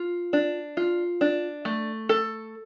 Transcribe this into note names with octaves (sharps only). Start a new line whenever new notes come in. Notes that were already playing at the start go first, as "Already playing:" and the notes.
Already playing: F4
D4
F4
D4
A3
A4